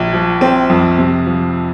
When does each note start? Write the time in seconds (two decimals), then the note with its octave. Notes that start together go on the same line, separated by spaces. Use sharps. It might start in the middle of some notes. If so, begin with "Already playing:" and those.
Already playing: A#1
0.13 F3
0.41 C4
0.70 F2
0.98 C3
1.26 F3